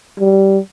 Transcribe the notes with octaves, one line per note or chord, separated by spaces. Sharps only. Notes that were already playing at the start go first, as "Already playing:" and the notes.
G3